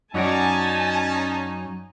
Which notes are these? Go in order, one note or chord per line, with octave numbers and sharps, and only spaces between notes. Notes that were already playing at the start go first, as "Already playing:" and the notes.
F#2 C#4 D#4 F#4 D5 G#5 A5